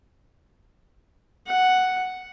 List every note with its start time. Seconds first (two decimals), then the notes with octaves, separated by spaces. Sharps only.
1.47 F#5